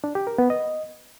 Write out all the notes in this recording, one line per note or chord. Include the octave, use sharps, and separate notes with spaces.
D4
G4
A#4
B3
D#5